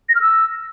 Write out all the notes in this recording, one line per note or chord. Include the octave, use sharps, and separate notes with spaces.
A#6
F6
E6